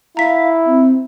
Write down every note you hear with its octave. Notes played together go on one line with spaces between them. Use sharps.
E4 F5 A#5 B6
C4